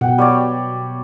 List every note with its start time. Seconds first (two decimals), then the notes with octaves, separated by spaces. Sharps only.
0.01 B2 F#5 G5
0.18 G3 C#5 D5